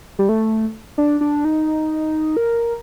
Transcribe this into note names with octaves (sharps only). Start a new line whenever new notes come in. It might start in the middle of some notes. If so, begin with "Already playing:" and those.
G3
A3
D4
D4
D#4
A#4